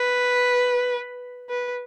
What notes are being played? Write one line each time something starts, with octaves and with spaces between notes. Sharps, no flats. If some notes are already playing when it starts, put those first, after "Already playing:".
Already playing: B4
B4